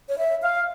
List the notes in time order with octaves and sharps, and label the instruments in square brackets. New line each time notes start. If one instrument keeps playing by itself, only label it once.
[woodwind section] C#5
E5
F5